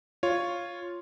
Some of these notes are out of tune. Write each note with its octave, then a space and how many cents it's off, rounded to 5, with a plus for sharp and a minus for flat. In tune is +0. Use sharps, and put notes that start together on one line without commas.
F4 +0 C#5 +0